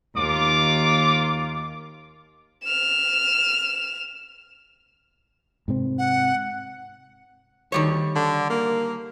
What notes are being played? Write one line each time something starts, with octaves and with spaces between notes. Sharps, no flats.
D#2 F4 D6
F6 E7
G#2 C3 C4
F#5
D2 D#3 G3 C#5
D3
A#3